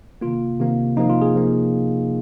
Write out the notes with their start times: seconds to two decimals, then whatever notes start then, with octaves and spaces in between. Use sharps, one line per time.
0.21 C3 D#3 A#3 F4
0.59 C3 D#3 A#3
0.96 C3 F3 A#3 D#4
1.10 F4
1.21 G#4
1.34 C3 F3 A#3